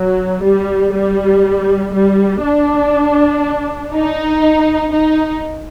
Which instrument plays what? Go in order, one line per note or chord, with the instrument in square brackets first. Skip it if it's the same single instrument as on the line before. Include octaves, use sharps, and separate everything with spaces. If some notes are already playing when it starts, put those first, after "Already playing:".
Already playing: [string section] F#3
G3
G3
G3
D4
D#4
D#4